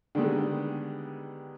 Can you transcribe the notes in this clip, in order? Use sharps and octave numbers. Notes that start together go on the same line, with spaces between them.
D3 D#3 G3 G#3 B3